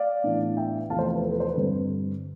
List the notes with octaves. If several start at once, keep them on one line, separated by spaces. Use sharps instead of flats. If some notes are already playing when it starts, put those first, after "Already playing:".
Already playing: D5 F5
A2 E3 B3 D4
E5 G5
E2 C3 F3 A3 C4 F5 A5
A4 C5
B4
A4
B4
A4 C5
B4
G2 D3 G3 C4